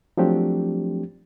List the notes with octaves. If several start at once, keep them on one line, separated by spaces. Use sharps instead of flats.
F3 F#3 A3 C4 D4 G4